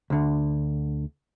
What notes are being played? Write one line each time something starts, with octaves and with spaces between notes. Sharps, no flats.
D2 D3